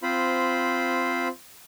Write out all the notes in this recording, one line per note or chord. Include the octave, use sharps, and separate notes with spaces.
C4 F4 C5 B5